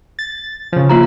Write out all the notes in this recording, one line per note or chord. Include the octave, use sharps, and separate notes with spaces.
A6
C#3 F3
A#3 F4 A#5